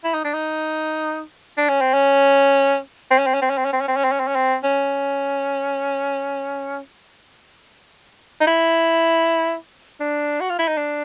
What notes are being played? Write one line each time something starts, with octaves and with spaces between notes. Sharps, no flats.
E4
D#4
D4
D#4
D4
C#4
C4
C#4
C4
C#4
C4
C#4
C4
C#4
C4
C#4
C4
C#4
C4
C#4
C4
C#4
C4
C#4
C4
C#4
D#4
E4
D4
F#4
F4
E4
D#4
D4